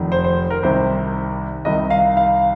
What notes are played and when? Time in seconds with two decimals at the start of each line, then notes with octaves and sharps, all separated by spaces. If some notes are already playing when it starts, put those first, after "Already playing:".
Already playing: F1 F2 D#3
0.12 C5
0.24 C5
0.50 A#4
0.63 C2 C3 D#3 C5
1.65 C2 C3 D#3 D#5
1.90 F5
2.17 F5